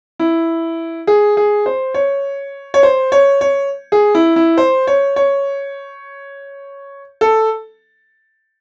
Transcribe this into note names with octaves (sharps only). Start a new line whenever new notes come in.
E4
G#4
G#4
C5
C#5
C#5
C5
C#5
C#5
G#4
E4
E4
C5
C#5
C#5
A4